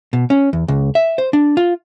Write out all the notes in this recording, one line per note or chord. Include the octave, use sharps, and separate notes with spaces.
B2
C#4
E2
C#2
E5
C5
D4
F4